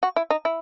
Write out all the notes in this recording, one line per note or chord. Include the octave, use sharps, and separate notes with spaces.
F#4
E4
D#4
E4